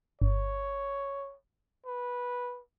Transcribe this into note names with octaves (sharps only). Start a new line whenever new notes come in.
G1 C#5
B4